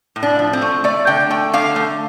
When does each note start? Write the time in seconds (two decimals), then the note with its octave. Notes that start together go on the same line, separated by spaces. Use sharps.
0.16 A2
0.23 D4
0.39 F3
0.53 C4
0.62 A3
0.84 A3 D5
1.07 D3 G5
1.30 A3 G5
1.53 D3 F5
1.76 A3